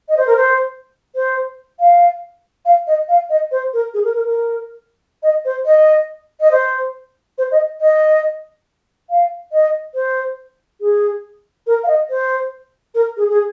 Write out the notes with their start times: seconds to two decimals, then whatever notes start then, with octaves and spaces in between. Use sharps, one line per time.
0.09 D#5
0.17 C5
0.27 A#4
0.37 C5
1.15 C5
1.80 F5
2.65 F5
2.87 D#5
3.09 F5
3.30 D#5
3.52 C5
3.73 A#4
3.94 G#4
4.04 A#4
4.15 A#4
4.26 A#4
5.23 D#5
5.45 C5
5.66 D#5
6.40 D#5
6.51 C5
7.38 C5
7.52 D#5
7.81 D#5
9.10 F5
9.52 D#5
9.95 C5
10.81 G#4
11.67 A#4
11.84 F5
11.88 D#5
12.10 C5
12.95 A#4
13.17 G#4
13.30 G#4